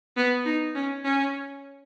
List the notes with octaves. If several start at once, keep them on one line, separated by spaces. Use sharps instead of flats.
B3
D#4
C#4
C#4